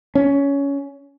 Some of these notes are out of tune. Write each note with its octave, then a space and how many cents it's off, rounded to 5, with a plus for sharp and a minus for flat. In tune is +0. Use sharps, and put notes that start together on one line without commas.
C#4 +15